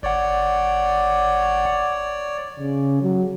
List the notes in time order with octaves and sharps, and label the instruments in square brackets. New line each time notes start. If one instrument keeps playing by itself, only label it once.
[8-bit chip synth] G1 F#5 [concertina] C#5 D5
[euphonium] C#3
F#3